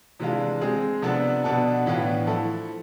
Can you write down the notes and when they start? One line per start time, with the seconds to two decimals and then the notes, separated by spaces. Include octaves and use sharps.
0.19 C3 E3 G#3 D4 F4
0.61 G#3 C4 G#4
1.02 C3 F3 B3 D4 A4
1.44 B2 B3 D4 A4
1.86 A2 E3 B3 D4 F4
2.27 F3 A3 E4 A4